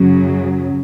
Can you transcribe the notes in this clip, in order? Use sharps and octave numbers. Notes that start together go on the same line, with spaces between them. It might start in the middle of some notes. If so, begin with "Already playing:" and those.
Already playing: F#2 C#3 F#3